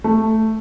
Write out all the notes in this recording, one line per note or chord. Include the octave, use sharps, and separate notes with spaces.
A3